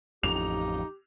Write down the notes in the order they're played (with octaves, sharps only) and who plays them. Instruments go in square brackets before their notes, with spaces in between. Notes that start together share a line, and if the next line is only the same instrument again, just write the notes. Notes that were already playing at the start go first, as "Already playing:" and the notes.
[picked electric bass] A1 F2 [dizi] D#4 [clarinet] G4 [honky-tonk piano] F7